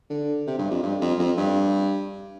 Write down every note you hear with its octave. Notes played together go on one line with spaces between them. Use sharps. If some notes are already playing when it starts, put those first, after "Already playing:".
D3
C3
G2
F2
G2
F2
F2
G2